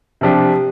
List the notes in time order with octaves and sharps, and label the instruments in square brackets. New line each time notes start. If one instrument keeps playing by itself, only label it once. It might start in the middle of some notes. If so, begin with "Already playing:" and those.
[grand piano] C3 F3 D4 G4